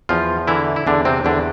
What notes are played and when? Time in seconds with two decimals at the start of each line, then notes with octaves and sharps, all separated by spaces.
0.09 E2 F3 F4
0.48 D3 E3 E4
0.76 E4
0.87 E2 D3 D4
1.05 C3 C4
1.25 E2 D3 D4